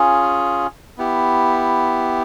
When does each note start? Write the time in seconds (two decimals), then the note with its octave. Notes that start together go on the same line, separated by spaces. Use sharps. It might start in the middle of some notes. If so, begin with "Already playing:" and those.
Already playing: C#4 F4 G#4
0.98 B3 E4 G4